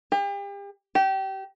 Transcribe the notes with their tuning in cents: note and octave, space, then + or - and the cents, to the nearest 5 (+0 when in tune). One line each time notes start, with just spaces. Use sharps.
G4 +40
G4 -25